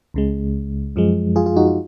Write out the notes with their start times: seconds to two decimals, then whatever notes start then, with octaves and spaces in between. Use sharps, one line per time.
0.14 C#2 C#3 G#3
0.96 F#2 F3 G#3
1.36 F4 G#4
1.46 F4 G#4
1.56 D#4 F#4
1.67 F4